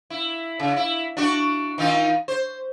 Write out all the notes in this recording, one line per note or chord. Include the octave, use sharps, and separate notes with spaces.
E4
C#3
E4
D4 F#4
D#3 D#4 F4
C5